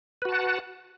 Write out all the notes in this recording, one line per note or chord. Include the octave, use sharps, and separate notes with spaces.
F#4 B4 F#5 A5